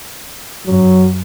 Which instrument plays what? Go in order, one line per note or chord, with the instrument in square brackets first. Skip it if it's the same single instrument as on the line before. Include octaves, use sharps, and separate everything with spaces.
[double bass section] F#2 [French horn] F#3